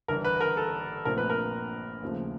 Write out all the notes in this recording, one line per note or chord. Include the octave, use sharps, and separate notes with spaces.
G1 G2 E3 A#4
B4
A#4
A4
A#1 A#2 F3 A3 C4 A#4
B4
A#4
D#2 C#3 F3 A3